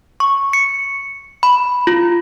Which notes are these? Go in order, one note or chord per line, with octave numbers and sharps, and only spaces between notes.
C#6
C#7
B5
F4